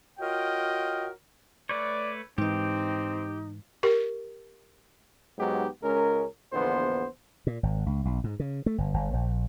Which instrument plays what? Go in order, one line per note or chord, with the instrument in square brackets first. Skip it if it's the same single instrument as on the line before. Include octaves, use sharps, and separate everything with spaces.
[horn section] F4 F#4 A#4 C#5 D#5 G5
[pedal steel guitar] A3 B4 C#5 [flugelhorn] D5
[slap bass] G#2 E3 [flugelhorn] C4 [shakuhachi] D#4 [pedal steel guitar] G4
[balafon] G4 A#4
[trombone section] G#2 F#3 G#3 B3 D#4 G4
C#2 G#3 C#4 A#4
A#1 E2 D3 B3 C5
[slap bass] A#2
G#1
C#2
B1
G#2
C#3
A3
G1
G1
A#1